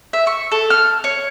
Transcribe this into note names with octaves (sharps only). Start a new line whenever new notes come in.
E5
C#6
A4
F6
C#5